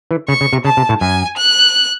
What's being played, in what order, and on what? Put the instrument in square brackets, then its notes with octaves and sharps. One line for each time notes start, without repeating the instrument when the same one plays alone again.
[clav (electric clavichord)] E3
[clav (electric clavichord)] C#3 [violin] C#6
[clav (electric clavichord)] C#3
C3
[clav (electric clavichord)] C#3 [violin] A5
[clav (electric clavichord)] C3
A2
[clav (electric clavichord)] F#2 [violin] G#5
[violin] F#6